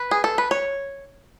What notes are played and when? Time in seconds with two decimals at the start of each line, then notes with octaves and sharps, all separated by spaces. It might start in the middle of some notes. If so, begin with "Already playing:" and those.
Already playing: B4
0.11 G#4
0.24 A4
0.38 B4
0.51 C#5